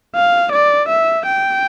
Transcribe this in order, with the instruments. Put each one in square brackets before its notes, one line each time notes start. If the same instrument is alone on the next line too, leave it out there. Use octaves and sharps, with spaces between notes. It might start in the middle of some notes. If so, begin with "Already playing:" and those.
[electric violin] F5
D5
E5
G5